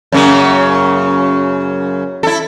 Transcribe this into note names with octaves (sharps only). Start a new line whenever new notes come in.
F#2 C#3 A#3
E4 A4